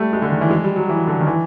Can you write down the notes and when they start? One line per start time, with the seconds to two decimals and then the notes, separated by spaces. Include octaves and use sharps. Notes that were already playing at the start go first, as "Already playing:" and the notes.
Already playing: G3 A3
0.13 G#3
0.22 D3
0.32 D#3
0.41 E3
0.51 G#3
0.64 G3
0.76 F#3
0.89 E3
1.07 D3
1.21 D#3
1.27 E3